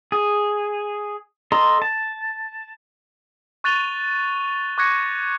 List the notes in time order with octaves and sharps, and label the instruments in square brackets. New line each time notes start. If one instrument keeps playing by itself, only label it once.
[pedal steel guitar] G#4
A4 D#5 A#5 C6
A5
[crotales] C#6 F#6 A6 D#7 F7 G7
C#6 D6 F#6 G#6 A#6 C#7